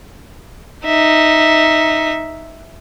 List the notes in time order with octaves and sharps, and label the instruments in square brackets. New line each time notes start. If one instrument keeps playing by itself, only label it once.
[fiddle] D#4 E5